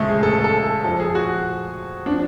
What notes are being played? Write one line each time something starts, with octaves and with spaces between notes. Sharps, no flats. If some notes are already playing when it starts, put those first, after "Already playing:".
Already playing: D2 C#3 F3 G#3 A3
G#4
A4
A4
A4
F2 F3 A4
G#4
F#4
F3 D4